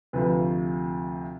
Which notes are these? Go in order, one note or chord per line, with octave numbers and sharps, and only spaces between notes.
D2 C3 F3 B4